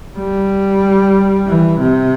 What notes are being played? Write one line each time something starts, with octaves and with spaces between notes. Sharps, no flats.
G3
E3
C3